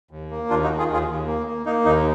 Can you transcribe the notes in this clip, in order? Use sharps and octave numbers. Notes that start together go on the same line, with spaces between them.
D#2
A#3
D#2 D4 F4
D#4 F#4
D#3
F4 G#4
D#2 F4 G#4
D#2
A#3
A#3
A#3 D#4
D#2 D#4